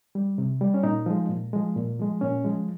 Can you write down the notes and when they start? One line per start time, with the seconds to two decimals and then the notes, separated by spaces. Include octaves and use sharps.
0.15 G3
0.38 C3
0.61 G3
0.74 C#4
0.83 A#2 D#4
1.06 F3 G#3
1.29 A#2
1.53 F3 G#3
1.76 A#2
1.99 F3 G#3
2.21 A#2 C#4
2.45 F3 G#3